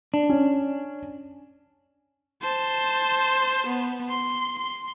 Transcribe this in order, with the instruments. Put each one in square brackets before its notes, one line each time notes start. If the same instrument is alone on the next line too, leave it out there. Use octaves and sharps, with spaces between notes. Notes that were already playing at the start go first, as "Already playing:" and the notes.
[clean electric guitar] D4
[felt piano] C#4
[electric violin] C5 A5
B3
C6
C6